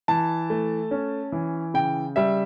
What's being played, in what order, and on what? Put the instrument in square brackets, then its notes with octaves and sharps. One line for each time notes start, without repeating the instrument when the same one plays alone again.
[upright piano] E3 A5
A3
C#4
E3
C#3 G5
G3 E5